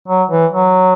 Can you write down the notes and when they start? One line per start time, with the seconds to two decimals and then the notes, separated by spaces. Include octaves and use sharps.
0.08 F#3
0.30 E3
0.53 F#3